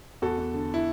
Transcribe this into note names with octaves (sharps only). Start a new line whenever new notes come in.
E2 F#4 A4
E2
D3
E4